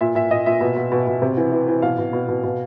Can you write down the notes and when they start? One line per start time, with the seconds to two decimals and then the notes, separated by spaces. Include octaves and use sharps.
0.01 A#2 E5
0.15 A#2 E5
0.30 A#2 D#5
0.46 A#2 E5
0.61 B2
0.76 B2
0.92 B2
1.07 B2
1.22 C3
1.37 E3
1.52 E3
1.68 E3
1.82 B2 F5
1.98 B2
2.13 B2
2.29 B2
2.44 B2